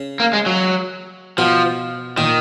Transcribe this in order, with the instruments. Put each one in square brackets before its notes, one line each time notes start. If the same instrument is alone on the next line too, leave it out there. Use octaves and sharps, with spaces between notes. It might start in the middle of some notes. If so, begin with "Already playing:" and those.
Already playing: [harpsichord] C#3
[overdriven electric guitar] A#3
G#3
F#3
[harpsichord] B2 [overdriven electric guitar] F3
[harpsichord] A#2 [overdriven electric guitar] D#3